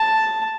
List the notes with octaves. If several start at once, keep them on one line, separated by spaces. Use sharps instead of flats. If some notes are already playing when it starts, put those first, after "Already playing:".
Already playing: A5